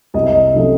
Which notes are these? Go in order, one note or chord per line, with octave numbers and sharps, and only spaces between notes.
C2 D#5
E5
D#5
C3 F3 A3 C#4